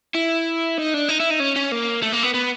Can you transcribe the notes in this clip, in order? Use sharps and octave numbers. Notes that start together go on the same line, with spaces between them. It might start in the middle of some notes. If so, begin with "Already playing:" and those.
E4
D#4
D4
D#4
E4
D#4
C#4
C#4
A#3
A3
A#3
B3
B3